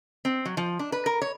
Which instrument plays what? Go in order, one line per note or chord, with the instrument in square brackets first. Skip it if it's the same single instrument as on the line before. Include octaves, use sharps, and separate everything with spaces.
[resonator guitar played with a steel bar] C4
F#3
F3
D4
B4
A#4
C#5